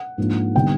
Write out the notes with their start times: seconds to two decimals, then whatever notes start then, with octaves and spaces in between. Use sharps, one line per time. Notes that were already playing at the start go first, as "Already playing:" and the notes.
Already playing: F#5
0.18 G#2 F3 A#3 D4
0.55 D3 G3 B3 D#4 G5